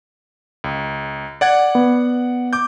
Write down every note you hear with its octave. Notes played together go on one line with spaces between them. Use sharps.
C#2
D5 F#5 G#6
B3
D6 G6